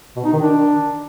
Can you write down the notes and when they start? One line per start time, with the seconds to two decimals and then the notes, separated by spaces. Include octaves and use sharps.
0.16 B2
0.25 D#4
0.33 D#3
0.42 D4